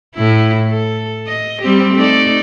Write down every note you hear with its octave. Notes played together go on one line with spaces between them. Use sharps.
A2 E4
A4
D#5
G3 C4 G4
A3 D#4 D5